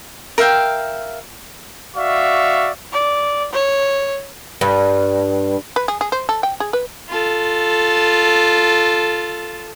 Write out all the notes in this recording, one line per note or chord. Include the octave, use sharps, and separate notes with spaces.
A#4 E5 F5 G5
F#4 D5 E5 F5 C#6
D5
C#5
G2
B4
G#4
G#4
C5
A4
G5
G#4
B4
F4 A4